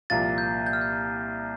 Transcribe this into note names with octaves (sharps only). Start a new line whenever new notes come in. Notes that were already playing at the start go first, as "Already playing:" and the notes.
C2 A#2 F3 A#3 F4 A6
G6
G6
F6
G6